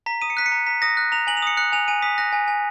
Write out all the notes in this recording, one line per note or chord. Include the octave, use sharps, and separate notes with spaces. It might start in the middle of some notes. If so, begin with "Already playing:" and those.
A#5 B6
D#6 D#7
C#7
F#6 B6
C#7
A#5
A#5 B6
D#6 A#6
F#6
A#5 F7
G#5 F#7
F7
D#6 C#7
F#6 C#7
G#5 F7
G#5 D#7
D#6 B6
F#6 A#6
G#5
G#5